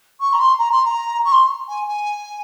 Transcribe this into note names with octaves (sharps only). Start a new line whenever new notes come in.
C#6
A#5
C6
A#5
C6
A#5
C#6
C6
G#5
G#5